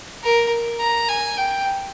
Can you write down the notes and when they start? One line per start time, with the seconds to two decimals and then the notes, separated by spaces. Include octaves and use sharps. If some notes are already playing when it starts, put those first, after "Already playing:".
0.23 A#4
0.80 A#5
1.08 G#5
1.37 G5